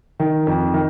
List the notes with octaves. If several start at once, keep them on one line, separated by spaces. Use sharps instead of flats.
D#3
F2
D#3